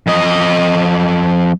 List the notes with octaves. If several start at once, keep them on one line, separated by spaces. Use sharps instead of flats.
F2 D#5